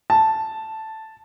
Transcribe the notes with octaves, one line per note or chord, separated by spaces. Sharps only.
A5